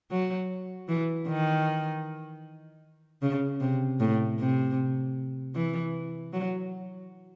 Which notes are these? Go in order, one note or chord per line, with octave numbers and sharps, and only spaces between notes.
F#3
E3
D#3
C#3
C3
A2
C3
E3
F#3